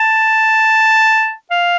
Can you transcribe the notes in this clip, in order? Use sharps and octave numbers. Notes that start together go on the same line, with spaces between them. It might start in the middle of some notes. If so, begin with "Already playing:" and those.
Already playing: A5
F5